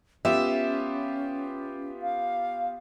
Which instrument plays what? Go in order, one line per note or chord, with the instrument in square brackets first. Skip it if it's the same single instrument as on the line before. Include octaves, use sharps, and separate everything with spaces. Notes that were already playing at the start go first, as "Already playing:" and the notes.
[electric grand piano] B3 F4 G4 [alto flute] C#4 [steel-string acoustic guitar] E5
[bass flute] F5